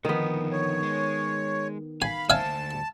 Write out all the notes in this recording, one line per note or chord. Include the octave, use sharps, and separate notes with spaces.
D3 D#3 F3 B3
C#5
G#3
F5 G#5 B5
D2 C5 E5 F5 G#5 A5